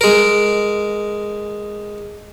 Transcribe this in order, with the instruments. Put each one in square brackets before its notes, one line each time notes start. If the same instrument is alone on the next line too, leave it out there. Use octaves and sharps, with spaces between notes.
[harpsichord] G#3 A#4